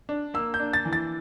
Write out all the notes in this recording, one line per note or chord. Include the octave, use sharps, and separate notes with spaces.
D4
A#3 E6
G6
D4
A6
E3
A6